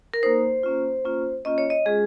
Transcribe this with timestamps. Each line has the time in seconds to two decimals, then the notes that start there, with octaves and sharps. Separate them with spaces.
0.14 A#4
0.23 A#3 D#4 C5
0.63 A#3 C#4 F4
1.04 A#3 C#4 F4
1.45 A#3 C#4 F4 D#5
1.58 C#5
1.70 D#5
1.86 G#3 C#4 F4 G#4